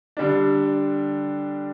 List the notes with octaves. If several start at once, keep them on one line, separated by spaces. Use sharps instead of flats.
D3 G3 D4